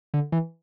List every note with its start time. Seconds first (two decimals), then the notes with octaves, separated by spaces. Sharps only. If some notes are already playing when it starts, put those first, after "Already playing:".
0.14 D3
0.32 E3